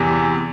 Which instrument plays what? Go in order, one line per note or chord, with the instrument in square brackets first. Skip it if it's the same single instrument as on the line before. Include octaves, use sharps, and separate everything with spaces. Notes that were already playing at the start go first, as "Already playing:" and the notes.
Already playing: [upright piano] E2 C3 E3